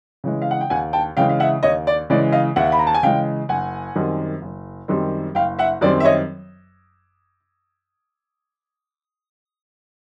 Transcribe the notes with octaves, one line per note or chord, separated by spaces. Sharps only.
C#3 E3 G#3
F5
F#5
G5
D#2 F#5 G#5
G5 A5
C#3 E3 G#3 F5 G5
F5
E5 F#5
D#2 C#5 D#5
D5
C#3 E3 G#3 D5
D#5 F5
D#2 E5 F#5
B5
A#5
A5
G#5
C#3 E3 G#3 F5 G5
F#1 F#5 G#5
F#2 D#3 G3 C4
F#1
F#2 D#3 G3 C4
F#1 F5 G5
E5 F#5
F#2 D#3 G3 C4 D5
E5
C#5 D#5